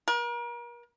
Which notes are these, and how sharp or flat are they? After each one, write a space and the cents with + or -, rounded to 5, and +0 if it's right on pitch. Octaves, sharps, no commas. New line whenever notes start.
A#4 +40